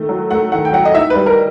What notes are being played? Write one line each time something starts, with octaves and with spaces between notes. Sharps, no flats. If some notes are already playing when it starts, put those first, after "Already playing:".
Already playing: D#3 A3
F#3
A3 F#5
D#3 F#5
G5
F#3 F#5
D#5
D#4 E5
B4
G3
A#4